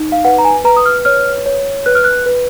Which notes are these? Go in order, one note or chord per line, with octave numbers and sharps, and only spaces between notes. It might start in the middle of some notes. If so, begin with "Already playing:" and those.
Already playing: D#4
F5
B4 F#5
A#5
G#5
B4 A#5
D#6
F6
C#5 F6
C#5
B4 F#6
F6
F#6
B4